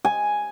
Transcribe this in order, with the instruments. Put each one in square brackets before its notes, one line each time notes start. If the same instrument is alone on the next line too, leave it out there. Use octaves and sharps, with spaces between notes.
[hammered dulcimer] G#5